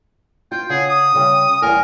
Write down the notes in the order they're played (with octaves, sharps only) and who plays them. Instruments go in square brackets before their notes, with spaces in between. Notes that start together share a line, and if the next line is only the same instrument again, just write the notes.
[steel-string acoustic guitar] F4 [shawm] G5
[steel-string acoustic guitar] C#3 F#5 [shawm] G#4
[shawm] D#6
[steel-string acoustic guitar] C#3 G3
[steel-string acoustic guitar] E2 G2 G#5 [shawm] A#4